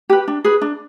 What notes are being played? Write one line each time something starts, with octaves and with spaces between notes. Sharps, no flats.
G4 B4
D4
G#4 B4
D4